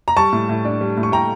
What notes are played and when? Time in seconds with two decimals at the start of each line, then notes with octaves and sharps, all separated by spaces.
0.08 A#5
0.16 G3 A5 C#6
0.32 A2
0.49 A2
0.65 D4
0.81 G3
0.97 A2
1.03 C#6
1.12 A2 G5 A#5